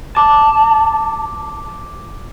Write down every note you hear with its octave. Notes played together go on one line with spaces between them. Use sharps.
A5 D6